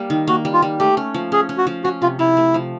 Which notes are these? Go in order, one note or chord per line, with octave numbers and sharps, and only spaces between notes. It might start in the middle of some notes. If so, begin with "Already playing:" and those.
Already playing: G3 A#3
D#3
A#3 F#4
G3
F4
G3
A3 G4
C#4
F3
C#4 G#4
C#4
F#4
F3
C#4 F#4
C3 F4
C3 E4
A3
F3